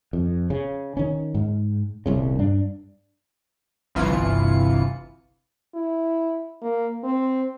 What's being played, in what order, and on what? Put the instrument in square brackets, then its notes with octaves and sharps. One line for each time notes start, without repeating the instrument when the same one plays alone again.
[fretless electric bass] F2
C#3
D#3 C#4
G#2
D#1 C2 C#3
G2 D4
[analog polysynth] G1 C2 E3 F4 C#7
[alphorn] E4
A#3
C4